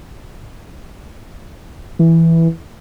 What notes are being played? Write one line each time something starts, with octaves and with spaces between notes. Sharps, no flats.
E3